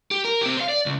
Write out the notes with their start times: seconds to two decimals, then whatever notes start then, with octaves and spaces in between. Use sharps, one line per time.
0.11 G4
0.25 A#4
0.41 C4 G4
0.57 C5 F5
0.69 D5
0.86 C#2